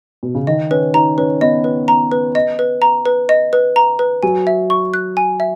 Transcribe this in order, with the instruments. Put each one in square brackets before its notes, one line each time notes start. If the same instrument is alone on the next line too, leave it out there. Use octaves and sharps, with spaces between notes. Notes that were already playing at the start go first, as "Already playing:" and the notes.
[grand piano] B2
C#3
[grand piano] D#3 [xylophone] D#5
[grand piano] C#4 [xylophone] B4
[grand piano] D#4 [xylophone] A#5
[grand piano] C#4 [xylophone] B4
[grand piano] B3 [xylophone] D#5
[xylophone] B4
A#5
B4
D#5
B4
A#5
B4
D#5
B4
A#5
B4
[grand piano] F#3 [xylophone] G#5
[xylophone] E5
C#6
F#6
G#5
E5